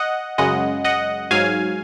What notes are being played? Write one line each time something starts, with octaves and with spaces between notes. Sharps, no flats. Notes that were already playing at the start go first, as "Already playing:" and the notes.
Already playing: D#5 F#5
F#2 C#3 G#3 D#5 F#5
D#5 F#5
G#2 F#3 F5 G#5